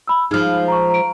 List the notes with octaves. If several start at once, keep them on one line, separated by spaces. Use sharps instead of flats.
B5 E6
F3 G#3 D#4 F6
A#5 C#6
A#5 D7